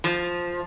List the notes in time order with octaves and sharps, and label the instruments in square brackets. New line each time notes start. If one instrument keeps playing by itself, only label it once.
[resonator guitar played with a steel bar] F3